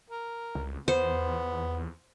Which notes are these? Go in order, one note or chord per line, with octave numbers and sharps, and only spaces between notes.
A#4
C#2
E2 B3 C5